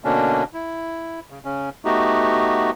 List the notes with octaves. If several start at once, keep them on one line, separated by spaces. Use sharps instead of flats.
B2 D3 A#3 C#4 D4
E4
C#3
C#3 C#4
A3 B3 D#4 F#4 G4